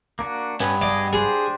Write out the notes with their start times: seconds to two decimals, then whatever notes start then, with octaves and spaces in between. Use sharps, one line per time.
0.19 A#3 D4 F#4
0.60 G2 B3 C#4
0.81 G#4 D5 D#5
1.13 D4 G4 G#4 C5